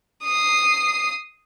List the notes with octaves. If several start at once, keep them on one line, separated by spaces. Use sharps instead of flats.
D#6 C7